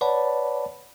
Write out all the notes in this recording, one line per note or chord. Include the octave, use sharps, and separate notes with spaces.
B4 C#5 D5 F#5 A5 B5